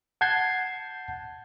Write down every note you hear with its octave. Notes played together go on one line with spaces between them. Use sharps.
F#5 A5 G6 G#6 C7